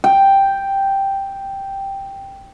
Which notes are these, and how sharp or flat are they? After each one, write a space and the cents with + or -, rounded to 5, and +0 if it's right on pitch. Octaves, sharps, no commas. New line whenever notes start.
G5 +0